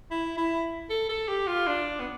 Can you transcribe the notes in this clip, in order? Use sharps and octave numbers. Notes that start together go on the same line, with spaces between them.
E4
E4
A4
A4
G4
F4
D4
B3